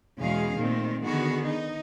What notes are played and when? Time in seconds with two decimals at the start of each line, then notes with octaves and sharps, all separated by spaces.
0.19 E2 B2 G#3 C#4 G#4 F5
0.58 A#2 D#3 A3 C4
1.04 D3 D#3 B3 F#4 G#4
1.45 D#4